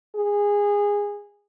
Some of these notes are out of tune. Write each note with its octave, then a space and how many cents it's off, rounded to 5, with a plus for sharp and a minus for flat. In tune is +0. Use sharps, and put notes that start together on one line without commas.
G#4 -20